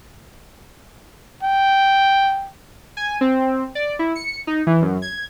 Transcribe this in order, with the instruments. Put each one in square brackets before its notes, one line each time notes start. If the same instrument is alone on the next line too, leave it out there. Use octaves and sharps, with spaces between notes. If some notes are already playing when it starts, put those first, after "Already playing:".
[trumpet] G5
[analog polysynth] G#5
C4
D5
E4
C#7
D#4
E3
F#2
G#6